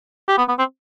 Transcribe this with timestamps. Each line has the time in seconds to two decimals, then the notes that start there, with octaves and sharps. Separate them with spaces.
0.28 G4
0.38 B3
0.49 B3
0.59 C4